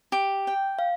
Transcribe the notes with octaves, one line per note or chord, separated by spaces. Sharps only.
G4
G5
F5